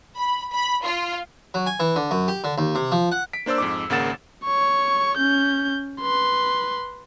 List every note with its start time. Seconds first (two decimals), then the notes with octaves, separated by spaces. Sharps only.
0.18 B5
0.54 B5
0.84 F4
1.54 F#3
1.66 G#5
1.80 E3
1.96 D3
2.11 F#2
2.28 G4
2.44 D3
2.58 D#2
2.75 C3
2.92 F3
3.12 F#5
3.33 B6 D7
3.46 A#3 D4 C5 D5 E6
3.58 F2 G#2 D6
3.90 G#1 C#3 A#3 F#5 A6 E7
4.44 C#5 C#6
5.18 C#4 G6
6.01 B4 C6